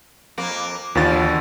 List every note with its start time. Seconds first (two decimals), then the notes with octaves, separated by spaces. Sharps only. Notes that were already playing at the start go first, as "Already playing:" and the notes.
0.38 F2 A#3
0.95 D#2 B2 D3 E3 F4 A6